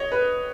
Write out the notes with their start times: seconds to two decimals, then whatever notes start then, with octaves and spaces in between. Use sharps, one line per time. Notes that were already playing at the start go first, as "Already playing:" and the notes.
Already playing: C#5 D#5
0.12 B4